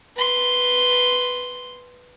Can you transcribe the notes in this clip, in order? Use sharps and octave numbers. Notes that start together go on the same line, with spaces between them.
B4 C6